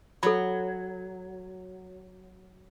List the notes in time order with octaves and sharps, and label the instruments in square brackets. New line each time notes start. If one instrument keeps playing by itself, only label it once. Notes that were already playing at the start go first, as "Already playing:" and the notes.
[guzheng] F#3 [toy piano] A4 B5